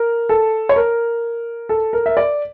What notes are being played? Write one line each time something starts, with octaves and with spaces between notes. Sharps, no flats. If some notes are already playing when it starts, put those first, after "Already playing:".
Already playing: A#4
A4
C#5
A#4
A4
A#4
E5
D5